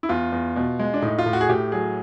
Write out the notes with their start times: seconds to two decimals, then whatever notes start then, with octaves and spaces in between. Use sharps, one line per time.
0.03 E4
0.09 E2 F4
0.32 E2
0.56 B2
0.79 G#3
0.94 D4
1.02 A2 D#4
1.18 F4
1.26 A2
1.33 F#4
1.41 G#4
1.49 A2 G4
1.72 F#3 G#4